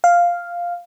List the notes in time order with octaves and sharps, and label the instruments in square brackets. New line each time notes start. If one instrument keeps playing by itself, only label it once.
[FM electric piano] F5